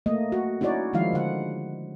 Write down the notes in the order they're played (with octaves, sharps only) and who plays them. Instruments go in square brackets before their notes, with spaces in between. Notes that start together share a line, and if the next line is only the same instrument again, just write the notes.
[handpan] A3 A#3 D#5
F#4
C#4 D#4 E4 F#4 C#5 D5
D#3 F3 G#3 E4 F5
D3 F#5